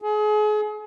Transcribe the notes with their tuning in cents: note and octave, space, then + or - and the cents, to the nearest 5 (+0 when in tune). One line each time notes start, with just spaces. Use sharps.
G#4 +35